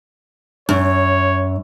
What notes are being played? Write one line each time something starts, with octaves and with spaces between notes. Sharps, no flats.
F#2 C#5